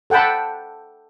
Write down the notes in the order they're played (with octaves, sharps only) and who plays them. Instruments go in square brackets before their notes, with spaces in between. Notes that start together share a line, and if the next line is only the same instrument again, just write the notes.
[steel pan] A4 F#5 G5 A5 B5